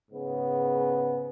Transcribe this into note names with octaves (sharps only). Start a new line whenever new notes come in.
G#2 C#3 B3